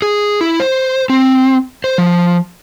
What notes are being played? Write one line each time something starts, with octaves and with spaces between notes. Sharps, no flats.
G#4
E4
C5
C4
C5
F3